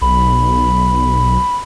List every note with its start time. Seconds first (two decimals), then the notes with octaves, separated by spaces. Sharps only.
0.02 B1 B5